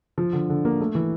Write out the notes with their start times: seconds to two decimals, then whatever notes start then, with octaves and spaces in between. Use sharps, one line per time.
0.18 F3
0.33 D3
0.49 D3
0.65 A#3
0.81 A3
0.95 E3